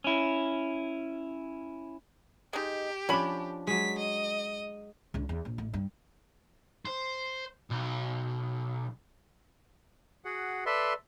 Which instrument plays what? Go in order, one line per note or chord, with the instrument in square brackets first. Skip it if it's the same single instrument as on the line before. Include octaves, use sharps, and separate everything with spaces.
[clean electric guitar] C#4 E4
[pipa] G#3 D#4 [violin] G4
[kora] F3 D4 [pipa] C#4 B5
[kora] F#3 G#3 [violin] B6
[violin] D#5
[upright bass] C#2 D3
E2
A#1
A1 A3
G2
[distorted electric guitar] C5
B1
[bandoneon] F#4 G#4 F#5
A4 B4 D5 E5 C6